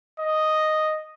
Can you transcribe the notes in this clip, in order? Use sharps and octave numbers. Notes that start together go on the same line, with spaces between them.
D#5